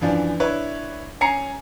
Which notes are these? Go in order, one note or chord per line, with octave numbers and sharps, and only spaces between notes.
F#2 E3 F3 D4
D4 E4 B4 C#5
C#4 G#5 A#5 C7 C#7